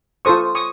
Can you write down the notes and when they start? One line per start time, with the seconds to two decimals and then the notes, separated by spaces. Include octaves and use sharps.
0.25 F4 A4 C5 C#6 D#6
0.55 C#6 D#6